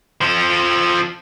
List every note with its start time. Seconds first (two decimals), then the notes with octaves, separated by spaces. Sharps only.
0.21 F3 A4